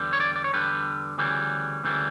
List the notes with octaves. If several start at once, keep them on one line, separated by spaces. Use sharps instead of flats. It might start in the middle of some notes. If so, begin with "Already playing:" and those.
Already playing: E2 D3 G3
C#5
D5
D5
C#5
E2 D3 G3 B4
D2 C#3 E3 G3
D2 C#3 E3 G3